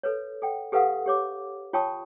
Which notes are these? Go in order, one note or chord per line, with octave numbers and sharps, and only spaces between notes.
A4 B4 C#5
A4 F#5 G5
G4 A4 B4 F5 F#5 D#6
G4 C#5 D6
F4 C#5 G5 A5 C#6 D#6